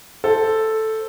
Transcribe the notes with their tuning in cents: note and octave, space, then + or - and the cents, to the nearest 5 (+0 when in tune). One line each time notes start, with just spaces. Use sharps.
A4 +0 C5 +0